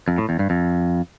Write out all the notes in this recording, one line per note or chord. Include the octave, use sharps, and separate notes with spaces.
F2
A2
E2
G2
F2